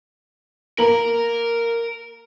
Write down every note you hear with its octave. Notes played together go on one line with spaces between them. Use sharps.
A#3 A#4 A#5 F#7